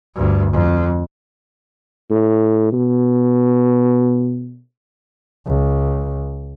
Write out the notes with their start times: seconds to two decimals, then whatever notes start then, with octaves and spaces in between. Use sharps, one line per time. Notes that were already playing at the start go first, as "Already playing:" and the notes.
0.15 D2 G2
0.53 F2
2.10 A2
2.73 B2
5.46 C#2